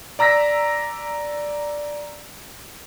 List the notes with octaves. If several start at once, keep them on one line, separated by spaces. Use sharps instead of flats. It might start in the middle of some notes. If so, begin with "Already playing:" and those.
D5 A#5 E6 A#6 B6